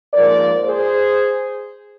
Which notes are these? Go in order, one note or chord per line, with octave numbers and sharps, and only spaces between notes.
G#2 F3 A#3 A#4 D5
G#4 C5